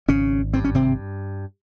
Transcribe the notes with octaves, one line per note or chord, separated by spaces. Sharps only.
G#1 C#3 C#4
G2 C4
C#4
C3 C4